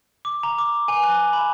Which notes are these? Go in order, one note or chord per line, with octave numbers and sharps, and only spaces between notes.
D6
A#5
D6
G#5
F#6
B5